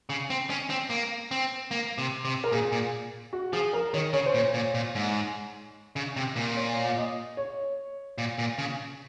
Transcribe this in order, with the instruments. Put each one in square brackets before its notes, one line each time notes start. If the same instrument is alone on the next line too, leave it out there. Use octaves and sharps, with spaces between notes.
[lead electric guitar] C#3
C4
C#4
C4
A#3
C4
A#3
C3
C3
[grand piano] A#4
[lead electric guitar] A#2 [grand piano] G#4
[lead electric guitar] A#2
[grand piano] F#4
[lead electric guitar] F3 [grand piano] G#4
[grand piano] A#4
[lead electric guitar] D#3 [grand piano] C#5
[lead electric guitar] C#3 [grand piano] C#5
[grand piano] C5
[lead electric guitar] A#2
[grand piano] C#5
[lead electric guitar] A#2
A#2
G#2
C#3
C3
A#2
[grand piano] C#5
D#5
C#5
[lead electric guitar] A#2
A#2
C#3